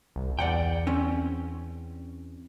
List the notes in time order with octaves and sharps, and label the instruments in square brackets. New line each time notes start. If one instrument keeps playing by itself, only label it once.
[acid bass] C2
[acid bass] E2 [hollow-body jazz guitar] D5 F#5 G5
[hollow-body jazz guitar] C4 C#4